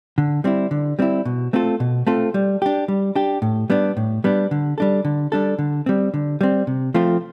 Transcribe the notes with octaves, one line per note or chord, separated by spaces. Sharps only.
D3
G3 C4 E4
D3
G3 C4 E4
B2
A3 C4 F4 A4
B2
A3 C4 F4 A4
G3
D4 G4
G3
D4 G4
A2
G3 B3 D4
A2
G3 B3 D4
D3
G3 D4 A4
D3
G3 D4 A4
D3
G3 C4
D3
G3 C4
C3
F3 A3 C4 F4